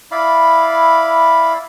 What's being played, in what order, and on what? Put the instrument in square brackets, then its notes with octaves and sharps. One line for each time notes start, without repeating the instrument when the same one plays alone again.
[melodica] E4 D5 F5 B5